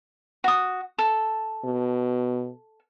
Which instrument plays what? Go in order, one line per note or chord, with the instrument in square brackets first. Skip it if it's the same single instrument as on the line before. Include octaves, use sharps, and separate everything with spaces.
[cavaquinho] F#4 D#6
A4
[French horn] B2